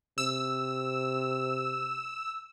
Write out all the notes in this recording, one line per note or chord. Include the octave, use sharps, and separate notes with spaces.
C3 E6